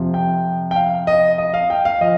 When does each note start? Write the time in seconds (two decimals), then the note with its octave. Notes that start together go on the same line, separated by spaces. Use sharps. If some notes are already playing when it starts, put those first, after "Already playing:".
Already playing: F2 C3 F3
0.14 G5
0.71 G5
0.76 F5
1.07 D#5
1.38 D#5
1.54 F5
1.70 G5
1.85 F5
2.01 F3 D#5